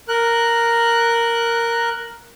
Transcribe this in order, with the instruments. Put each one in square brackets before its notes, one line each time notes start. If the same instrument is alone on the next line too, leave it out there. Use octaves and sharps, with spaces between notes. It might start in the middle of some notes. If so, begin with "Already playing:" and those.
[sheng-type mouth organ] A#4 F#6